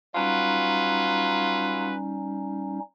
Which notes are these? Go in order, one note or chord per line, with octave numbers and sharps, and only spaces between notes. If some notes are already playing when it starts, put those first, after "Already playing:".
F#3 G3 C#4 D#4 F4 B4